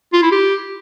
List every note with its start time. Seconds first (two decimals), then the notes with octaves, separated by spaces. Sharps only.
0.13 F4
0.22 E4
0.31 G4